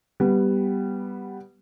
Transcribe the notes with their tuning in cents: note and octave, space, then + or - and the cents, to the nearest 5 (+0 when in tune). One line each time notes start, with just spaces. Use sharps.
G3 +0 B3 +0